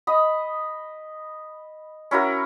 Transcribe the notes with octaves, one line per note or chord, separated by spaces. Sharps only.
D#5 B5 D#6
C#4 E4 F#4 A#4